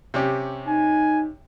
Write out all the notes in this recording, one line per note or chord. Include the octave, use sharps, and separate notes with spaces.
C3 C#4 G4
D#4 G#5